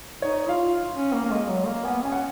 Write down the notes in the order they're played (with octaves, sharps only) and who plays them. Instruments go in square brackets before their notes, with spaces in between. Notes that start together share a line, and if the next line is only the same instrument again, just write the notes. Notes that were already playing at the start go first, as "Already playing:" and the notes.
[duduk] D#4 [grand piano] C#5
[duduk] F4 [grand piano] F5
[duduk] C#4
A#3
A#3
G#3
F#3
A#3
[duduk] B3 [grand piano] G#5
[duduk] C#4 [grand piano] G#5
[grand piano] F#5